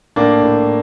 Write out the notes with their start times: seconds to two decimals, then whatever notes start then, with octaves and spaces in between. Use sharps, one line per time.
0.16 A2 A#3 D4
0.43 A2